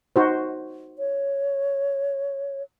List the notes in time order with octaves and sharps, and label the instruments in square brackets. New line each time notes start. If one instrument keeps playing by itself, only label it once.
[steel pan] D#4 F#4 C5
[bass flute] C#5